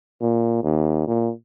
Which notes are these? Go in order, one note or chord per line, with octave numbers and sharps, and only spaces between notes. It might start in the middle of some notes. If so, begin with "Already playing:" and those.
A#2
D#2
A#2